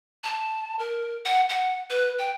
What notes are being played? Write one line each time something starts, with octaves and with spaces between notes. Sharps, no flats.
A5
A#4
F#5
F#5
B4
G5